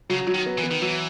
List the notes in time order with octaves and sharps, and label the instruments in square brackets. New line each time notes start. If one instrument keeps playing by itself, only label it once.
[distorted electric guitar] C#3 [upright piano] F#3
[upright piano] F#3
[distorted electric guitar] D#3
[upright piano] B3
[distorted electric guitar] E3
[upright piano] B3
[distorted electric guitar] D#3
[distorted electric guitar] E3 [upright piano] F#3